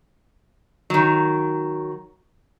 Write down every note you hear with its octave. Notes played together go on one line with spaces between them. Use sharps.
D#3 F#3